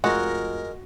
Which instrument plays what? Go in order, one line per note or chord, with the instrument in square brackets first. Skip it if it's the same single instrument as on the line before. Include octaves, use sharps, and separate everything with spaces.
[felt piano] F1 F4 A#6 [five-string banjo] G#3 [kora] F#4 [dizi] A#4